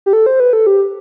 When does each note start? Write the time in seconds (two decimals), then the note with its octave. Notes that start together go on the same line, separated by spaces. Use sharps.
0.06 G4
0.13 A4
0.26 C5
0.40 B4
0.53 A4
0.67 G4